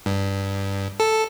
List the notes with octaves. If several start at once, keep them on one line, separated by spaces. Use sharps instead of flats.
G2
A4